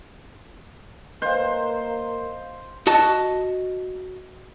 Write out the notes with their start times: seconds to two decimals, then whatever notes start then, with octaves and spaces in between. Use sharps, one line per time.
1.22 A#3 C5 D#5 F5
2.87 F#4 D#5 A5